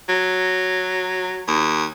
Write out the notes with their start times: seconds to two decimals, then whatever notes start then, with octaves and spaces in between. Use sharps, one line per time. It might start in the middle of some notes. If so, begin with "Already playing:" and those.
0.09 F#3
1.47 D#2